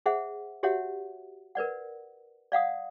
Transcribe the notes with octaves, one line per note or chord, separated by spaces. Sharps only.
G#4 C5 E5 F#5
F#4 G4 C#5 E5 F#5
A#4 B4 D5 F#5
D5 F5 F#5 D#6